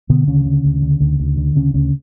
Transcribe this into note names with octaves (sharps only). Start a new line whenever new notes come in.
B2 D3 B3
D2 C#3 C#4
D3
D2
D3
D2
D2
D3
D2 C#3 C#4
D2 C#3 C#4